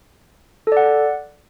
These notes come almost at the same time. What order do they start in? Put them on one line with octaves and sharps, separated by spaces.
A4 D5 F#5